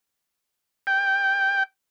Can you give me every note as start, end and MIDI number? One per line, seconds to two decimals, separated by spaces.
0.87 1.63 79